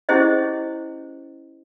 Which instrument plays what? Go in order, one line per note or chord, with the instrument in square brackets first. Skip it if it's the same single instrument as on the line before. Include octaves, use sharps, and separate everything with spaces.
[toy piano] C#4 E4 G4 G#4 C5 D#5